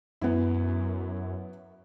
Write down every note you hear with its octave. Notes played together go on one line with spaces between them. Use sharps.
F#2 B3 E4